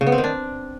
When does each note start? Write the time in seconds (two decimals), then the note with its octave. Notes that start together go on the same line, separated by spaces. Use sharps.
0.01 C#3
0.07 B3
0.12 C4
0.18 D#3
0.24 D4